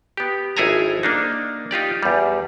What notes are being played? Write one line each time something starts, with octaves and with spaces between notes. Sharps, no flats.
B3 G4
G#1 E4 G#4 A4 G#5 A#5
A#3 D4 D#4
D#4 F4 G4 D5
E2 G3